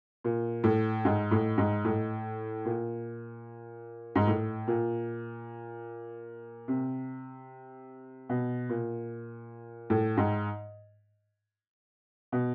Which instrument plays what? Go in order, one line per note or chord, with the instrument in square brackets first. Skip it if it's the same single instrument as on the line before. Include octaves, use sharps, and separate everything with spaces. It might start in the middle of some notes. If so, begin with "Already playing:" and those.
[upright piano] A#2
A2
G#2
A2
G#2
A2
A#2
G#2
A2
A#2
C3
B2
A#2
A2
G#2
B2